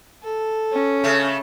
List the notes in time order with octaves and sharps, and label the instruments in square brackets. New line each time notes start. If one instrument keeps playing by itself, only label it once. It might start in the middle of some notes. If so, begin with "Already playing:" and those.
[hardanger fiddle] A4
[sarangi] C#4
[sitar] C#3 A3